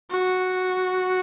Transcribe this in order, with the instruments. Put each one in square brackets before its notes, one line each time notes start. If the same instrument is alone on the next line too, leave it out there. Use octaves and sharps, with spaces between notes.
[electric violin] F#4